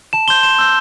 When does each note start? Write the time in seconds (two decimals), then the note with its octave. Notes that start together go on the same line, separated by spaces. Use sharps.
0.13 A5 E7
0.28 C6 G6 G7
0.43 C6 E7
0.59 E6 G6